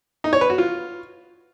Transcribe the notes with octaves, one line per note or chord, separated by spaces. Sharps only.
D#4
C#5
B4
F#4
F4